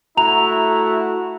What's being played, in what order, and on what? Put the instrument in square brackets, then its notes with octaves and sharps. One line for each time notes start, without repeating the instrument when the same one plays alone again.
[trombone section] A3 E4 F#4 [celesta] A#5 F7